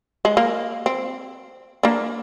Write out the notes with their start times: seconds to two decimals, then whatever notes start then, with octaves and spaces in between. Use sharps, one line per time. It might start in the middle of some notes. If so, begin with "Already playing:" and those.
0.25 G#3
0.37 A#3
0.86 C4
1.83 A#3 D4